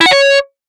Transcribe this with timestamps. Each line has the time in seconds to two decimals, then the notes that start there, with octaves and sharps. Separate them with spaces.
0.01 E4
0.06 F#5
0.11 C#5